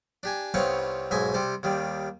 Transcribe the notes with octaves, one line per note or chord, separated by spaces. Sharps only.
D4 G4 G#5
C2 B3 C4 D#4 C#5 F5
B1 G#2 D#5 E5 G#5
C3 G3 C5
D#2 D#3 G3